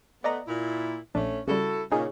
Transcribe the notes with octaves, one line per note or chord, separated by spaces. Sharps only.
A3 B3 D5 D#5 A#5
A#2 E4
A#1 A3 C#4 D4
C#3 G3 E4 F#4 A4
A#2 C#3 C#4 D#4 G#4